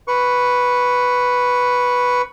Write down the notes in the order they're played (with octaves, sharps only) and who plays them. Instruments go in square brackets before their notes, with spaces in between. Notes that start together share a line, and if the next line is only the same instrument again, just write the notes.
[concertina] B4 C#6